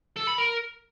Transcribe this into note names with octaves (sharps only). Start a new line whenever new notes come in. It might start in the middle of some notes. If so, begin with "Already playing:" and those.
A4
B5
A#4